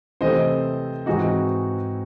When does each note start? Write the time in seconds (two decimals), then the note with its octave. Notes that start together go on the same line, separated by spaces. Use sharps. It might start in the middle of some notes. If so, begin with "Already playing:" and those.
0.21 C3 E3 A3 C4 C5 D#5
1.06 G#2 E3 G#3 C4 D#4 F#4